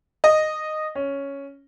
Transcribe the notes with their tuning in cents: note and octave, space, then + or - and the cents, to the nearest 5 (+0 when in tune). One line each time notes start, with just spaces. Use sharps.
D#5 -10
C#4 +0